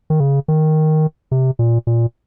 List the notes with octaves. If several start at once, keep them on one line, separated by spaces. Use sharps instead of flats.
D#3
C#3
D#3
C3
A#2
A#2